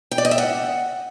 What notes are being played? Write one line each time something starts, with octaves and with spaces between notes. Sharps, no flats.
G5
D5
D#5
E5
F#5